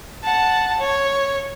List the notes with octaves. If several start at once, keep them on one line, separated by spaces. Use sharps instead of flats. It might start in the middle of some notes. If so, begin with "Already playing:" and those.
F#5 A5
C#5